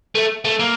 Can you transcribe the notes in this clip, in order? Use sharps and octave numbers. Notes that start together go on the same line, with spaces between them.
A3
A3
A#3